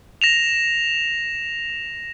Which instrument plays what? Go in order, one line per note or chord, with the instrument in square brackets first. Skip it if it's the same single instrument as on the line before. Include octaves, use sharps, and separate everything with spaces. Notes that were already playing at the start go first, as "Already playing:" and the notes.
[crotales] A#6 E7 F7